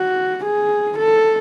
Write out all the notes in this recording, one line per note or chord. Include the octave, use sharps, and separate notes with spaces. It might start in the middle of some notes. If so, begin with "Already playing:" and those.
Already playing: F#4
G#4
A4